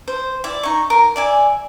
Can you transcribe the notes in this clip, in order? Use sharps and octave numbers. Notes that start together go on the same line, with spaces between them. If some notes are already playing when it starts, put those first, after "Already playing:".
C5
E4 D5
D#4 C#6
A#4
D5 E5 G#5